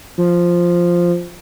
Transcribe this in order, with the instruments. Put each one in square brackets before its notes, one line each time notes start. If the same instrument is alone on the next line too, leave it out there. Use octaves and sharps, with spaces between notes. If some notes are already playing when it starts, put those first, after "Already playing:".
[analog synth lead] F3